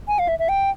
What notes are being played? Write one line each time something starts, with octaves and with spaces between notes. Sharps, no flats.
G#5
F5
E5
E5
G5